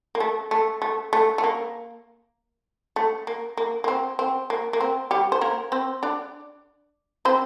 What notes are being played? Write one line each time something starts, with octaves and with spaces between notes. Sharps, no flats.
A#3
A3
A3
A3
A3
A3
A#3
A3
A#3
A#3
A#3
C4
C4
A#3
A#3
C4
G3 G4
C5
A#3 A#4
C4 C5
D4 D5
C4 C5